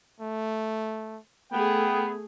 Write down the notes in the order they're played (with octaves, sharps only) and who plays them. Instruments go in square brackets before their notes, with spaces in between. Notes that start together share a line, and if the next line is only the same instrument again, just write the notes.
[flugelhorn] A3
[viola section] A3 G#4 [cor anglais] B3 [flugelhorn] G5